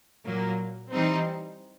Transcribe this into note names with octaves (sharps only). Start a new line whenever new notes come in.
A#2 F#3 A#3
E3 G3 C4 D#4